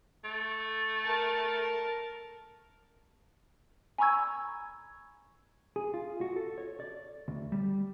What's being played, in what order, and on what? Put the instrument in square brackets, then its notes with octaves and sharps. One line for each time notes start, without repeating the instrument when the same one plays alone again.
[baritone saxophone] A3
[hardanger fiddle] A#4 A5
[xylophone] G#5 A#5 B5 C#6 E6 G#6
[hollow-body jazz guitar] G#4
F4
F#4
A4
C#5
D5
D2
G3